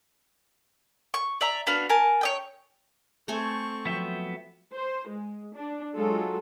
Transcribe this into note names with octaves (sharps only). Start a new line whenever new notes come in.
C#6
D5 E5 A#5
B3 D4 F#4 F5
A#4 G#5 A5
C#5 D#5 G5
A3 C4 A4 G#5 C#6
F3 F#3 B3 E5 G5
C5
G#3
D4
F#3 G#3 F4 A4